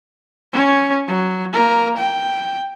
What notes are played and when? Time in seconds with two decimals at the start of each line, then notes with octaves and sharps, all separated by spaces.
0.52 C#4 C#5
1.08 F#3
1.53 A#3 A#4
1.97 G5